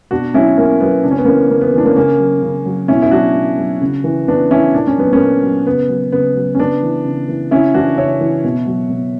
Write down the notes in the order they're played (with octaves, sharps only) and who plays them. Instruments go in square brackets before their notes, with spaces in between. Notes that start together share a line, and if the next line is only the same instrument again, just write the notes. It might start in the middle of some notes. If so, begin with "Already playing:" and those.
[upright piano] B2 D4 F#4
F#3 C#4 E4
B2 A#3 C#4
F#3 B3
C#3 D4
C#4
B3
E3 A#3 C#4
C#3 A#3
B3
E3 D4
A#3 C#4
C#3 A#3 C#4
F#3
C#3
F#3
B2 C#4 E4
E4
F#3 D4 F#4
B2
F#3
C#3
E3
C#3 B3 D4
E3 C#4 E4
A#2 D4
C#4
F#3 B3
A#3 C#4
A#2
F#3
C#3 B3
F#3
C#3 B3
F#3
C#4
C#3 B3 D4
E3
C#3
E3
C#3 C#4 E4
E3 D4 F#4
C#3 C#5 E5
E3
B2
F#3
B2